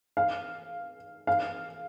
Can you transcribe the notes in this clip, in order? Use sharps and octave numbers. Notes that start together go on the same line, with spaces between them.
F5
F5